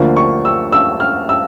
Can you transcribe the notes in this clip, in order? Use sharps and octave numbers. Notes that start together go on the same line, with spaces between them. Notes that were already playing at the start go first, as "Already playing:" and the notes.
Already playing: D2 D3 F3 A#3
C#6
E6
E6
F6
E6